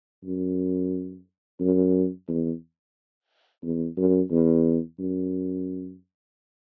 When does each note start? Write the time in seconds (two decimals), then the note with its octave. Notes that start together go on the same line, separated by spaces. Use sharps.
0.25 F#2
1.60 F#2
2.28 E2
3.63 E2
3.97 F#2
4.31 E2
5.00 F#2